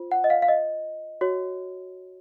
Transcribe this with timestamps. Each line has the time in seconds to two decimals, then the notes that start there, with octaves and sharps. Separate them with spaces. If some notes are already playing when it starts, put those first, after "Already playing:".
Already playing: F4 C5
0.11 F#5
0.24 D#5
0.30 F5
0.42 F5
0.48 D#5
1.21 F#4 C#5